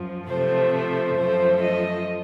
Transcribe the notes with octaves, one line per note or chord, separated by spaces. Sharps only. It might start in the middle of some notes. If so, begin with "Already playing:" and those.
Already playing: F#2 F3
C3 F3 A3 C5
C5
F#2 F3 A3 C5
D#5